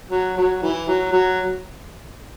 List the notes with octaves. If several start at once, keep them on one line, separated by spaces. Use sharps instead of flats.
F#3
F#3
E3
F#3
F#3